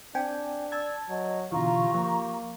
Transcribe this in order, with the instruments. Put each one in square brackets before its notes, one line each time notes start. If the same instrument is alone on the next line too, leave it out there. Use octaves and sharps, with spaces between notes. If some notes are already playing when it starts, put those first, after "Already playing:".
[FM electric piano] C4 G5 G#5 [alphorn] D4
[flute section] D5 E6 [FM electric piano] A5 G#6
[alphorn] F#3 [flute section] D#5
[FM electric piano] B2 D3 E3 [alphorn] F4 [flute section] G4 A#5 C#6
[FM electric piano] F3 [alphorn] A#3